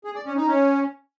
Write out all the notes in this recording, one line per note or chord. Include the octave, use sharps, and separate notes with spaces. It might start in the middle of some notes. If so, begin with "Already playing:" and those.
G#4
D5
C#4
D#4
C#4